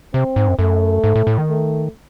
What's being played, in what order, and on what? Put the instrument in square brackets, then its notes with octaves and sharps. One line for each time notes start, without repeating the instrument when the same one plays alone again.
[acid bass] C3 [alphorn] C4
[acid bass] G#2
F#2
[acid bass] F#2 [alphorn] A3
[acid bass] G#2
A2
A2
D#3
[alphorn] A3